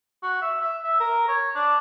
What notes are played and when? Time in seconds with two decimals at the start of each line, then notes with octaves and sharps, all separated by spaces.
0.23 F#4
0.42 E5
0.61 E5
0.84 E5
1.00 A#4
1.28 C#5
1.55 D4